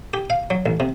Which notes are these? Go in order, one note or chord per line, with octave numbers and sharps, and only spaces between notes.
G4
F5
F#3
A1
C3